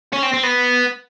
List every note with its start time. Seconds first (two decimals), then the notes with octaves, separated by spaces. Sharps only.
0.13 C#4
0.23 C4
0.33 C4
0.43 B3